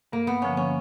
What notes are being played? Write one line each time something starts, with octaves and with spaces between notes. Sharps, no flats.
G2 A#3
B3
D3 F3 A#3 C#4
C#4